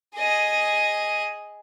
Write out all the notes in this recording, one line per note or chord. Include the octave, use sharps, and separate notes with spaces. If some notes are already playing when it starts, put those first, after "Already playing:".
G#4 D#5